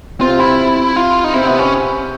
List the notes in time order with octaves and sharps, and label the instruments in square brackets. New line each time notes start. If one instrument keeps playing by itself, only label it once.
[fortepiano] C3 C4 [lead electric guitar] F4
[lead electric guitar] E4
F4
D#4
[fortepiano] C3 C4 [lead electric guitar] E4
[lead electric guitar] B3
C#4